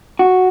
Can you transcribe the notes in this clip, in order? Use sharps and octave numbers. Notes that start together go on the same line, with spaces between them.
F#4